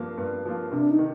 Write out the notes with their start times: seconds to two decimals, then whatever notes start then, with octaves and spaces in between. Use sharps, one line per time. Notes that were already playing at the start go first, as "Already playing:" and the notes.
Already playing: G2 F3 A#3 F4
0.17 G2
0.45 F3 A#3 F4
0.72 C3 D4
0.90 D#4
0.99 D#3